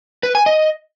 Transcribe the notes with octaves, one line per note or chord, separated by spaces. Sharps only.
B4
G#5
D#5